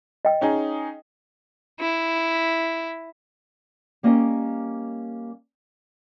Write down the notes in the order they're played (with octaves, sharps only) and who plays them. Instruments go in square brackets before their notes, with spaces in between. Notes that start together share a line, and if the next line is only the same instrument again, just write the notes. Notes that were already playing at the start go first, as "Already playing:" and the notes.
[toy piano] D#5 G5
[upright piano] C#4 D#4 G#4
[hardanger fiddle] E4
[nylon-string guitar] G3 A#3 C#4 D#5